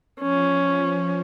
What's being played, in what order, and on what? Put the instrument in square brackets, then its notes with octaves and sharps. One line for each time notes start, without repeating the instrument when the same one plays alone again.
[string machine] F3 [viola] C#4